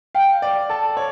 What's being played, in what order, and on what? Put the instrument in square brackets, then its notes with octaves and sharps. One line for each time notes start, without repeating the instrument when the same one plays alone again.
[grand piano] F5 [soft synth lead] G5
[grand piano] D5
[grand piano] A4 [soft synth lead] A5
[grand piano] C#5